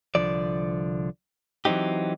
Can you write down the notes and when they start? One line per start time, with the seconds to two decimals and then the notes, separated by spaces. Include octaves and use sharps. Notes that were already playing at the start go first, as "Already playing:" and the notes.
0.15 C2 D3 F3 D5
1.65 E3 F#3 A3 C4 D#4 G4